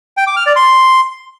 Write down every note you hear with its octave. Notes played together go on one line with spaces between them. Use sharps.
G5
D6
F6
D5
C6